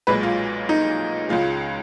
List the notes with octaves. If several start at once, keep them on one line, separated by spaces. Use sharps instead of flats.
B1 A#2 G#3 B4
F4
D#4
C#2 C#3 G#3 F4